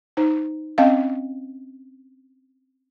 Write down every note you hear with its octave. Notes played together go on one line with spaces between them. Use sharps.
D#4 C5
C4 C#4 D#5 F5